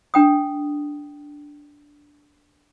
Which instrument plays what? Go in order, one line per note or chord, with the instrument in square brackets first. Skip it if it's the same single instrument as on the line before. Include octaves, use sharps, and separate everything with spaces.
[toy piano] D4 G5 D#6